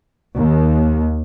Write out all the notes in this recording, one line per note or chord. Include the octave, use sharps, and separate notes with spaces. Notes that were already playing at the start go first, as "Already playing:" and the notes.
D#2